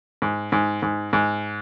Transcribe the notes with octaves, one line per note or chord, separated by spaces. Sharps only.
G#2
G#2
G#2
G#2